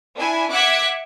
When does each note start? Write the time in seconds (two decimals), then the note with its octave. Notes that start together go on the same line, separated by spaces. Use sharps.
0.18 D4 E4 G#5
0.50 E5 F#5 D6 F#6 G#6 B6